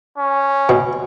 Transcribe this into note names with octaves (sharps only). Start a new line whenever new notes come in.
C#4
B2